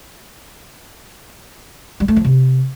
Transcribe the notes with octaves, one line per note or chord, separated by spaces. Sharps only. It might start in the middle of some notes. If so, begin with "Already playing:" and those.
G3
A3
F3
C3